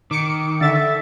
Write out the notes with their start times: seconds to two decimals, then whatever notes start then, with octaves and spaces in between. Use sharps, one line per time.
0.11 D#3 D6 C#7
0.61 D3 E5 A6